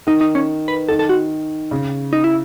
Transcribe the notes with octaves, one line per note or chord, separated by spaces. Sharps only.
D#3 D#4
D#4
C#4
B4
D#3 A4
A4
F#4
C#3
D#4
E4